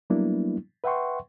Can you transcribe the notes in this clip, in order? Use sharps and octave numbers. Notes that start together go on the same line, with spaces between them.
F#3 G3 A#3 B3 D4 E4
B4 E5 F#5 G5 C6 C#6